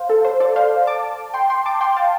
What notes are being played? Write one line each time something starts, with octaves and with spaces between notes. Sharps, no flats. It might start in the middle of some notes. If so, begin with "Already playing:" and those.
Already playing: C5 F5
A4
C5
A4 D5
C5 F5
A5 D6
G5 C6
G5 C6
A5 D6
G5 C6
F5 A5